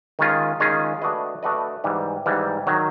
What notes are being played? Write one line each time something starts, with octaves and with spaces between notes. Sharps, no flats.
D#3 G#3 C#4 F4 G#4
D#3 G#3 C#4 F4 G#4
A3 D4 F#4 B4 D#5
A3 D4 F#4 B4 D#5
G#2 E3 G3
G#2 E3 G3
D#3 F#3